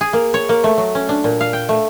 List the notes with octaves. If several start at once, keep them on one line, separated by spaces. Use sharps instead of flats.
G#4
A#3
C#5
A#3
A3
F#3
C#4
D4
A#2
F5
G5
A3